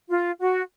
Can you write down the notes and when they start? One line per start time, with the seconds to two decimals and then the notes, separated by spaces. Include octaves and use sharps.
0.09 F4
0.39 F#4